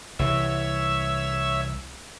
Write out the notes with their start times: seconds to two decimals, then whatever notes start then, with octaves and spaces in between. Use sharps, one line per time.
0.19 C2 E3 C#5 E5 E6